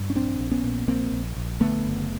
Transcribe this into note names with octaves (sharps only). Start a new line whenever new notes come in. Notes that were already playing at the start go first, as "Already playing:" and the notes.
Already playing: G2
C#4
A#1 C4 D4
A#1
B3 C#4
A#2
A#1 A#3 C4
A#1
A#1
D3 A3 B3
F#1